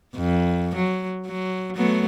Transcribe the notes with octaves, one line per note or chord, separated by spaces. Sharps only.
F2
F#3
F#3
F#3 A3 B3